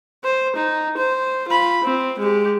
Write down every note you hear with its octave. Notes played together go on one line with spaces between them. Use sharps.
C5
D#4
C5
F4 B5
C4
G#3 G4